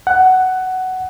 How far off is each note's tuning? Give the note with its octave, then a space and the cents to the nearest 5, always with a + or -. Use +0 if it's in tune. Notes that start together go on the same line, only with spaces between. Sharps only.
F#5 +10